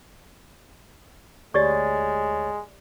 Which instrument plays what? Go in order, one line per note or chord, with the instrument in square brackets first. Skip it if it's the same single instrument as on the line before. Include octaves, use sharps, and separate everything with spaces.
[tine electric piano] D2 C#5 A6 [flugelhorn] G#3 [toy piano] G4 D5 C#6